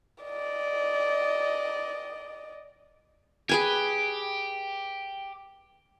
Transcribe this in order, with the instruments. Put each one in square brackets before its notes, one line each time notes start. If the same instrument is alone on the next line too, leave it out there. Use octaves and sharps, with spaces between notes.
[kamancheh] D5 D#5
[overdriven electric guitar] G4 [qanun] G#4 B4 G#5